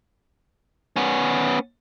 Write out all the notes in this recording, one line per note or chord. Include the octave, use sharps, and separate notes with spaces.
B3 C#4